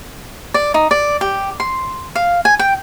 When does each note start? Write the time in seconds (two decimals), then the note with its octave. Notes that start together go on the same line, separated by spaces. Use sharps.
0.54 D5
0.74 D#4
0.91 D5
1.21 G4
1.60 C6
2.15 F5
2.45 G#5
2.59 G5